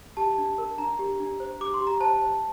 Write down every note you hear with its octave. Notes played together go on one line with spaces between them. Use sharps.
G4 A5
D4
A#4
D4 A#5
G4
D4
C5
G4 D6
C6
G4
A#5
C5 A5
C5